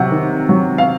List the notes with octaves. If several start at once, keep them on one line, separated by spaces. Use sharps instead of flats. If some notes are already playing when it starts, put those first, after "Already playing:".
Already playing: C3 F#3 F#5
D#3
F#3
F5